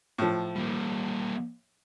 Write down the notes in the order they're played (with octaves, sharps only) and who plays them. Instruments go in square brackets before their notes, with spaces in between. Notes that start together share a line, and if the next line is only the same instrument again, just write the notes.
[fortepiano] A2 F3
[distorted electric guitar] G3 A#3